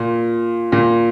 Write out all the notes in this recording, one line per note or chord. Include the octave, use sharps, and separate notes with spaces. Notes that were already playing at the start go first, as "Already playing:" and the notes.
Already playing: A#2
A#2